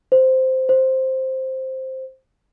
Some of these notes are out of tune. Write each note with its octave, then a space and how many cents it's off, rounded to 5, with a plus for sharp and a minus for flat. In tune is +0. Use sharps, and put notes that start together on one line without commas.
C5 -5
C5 +5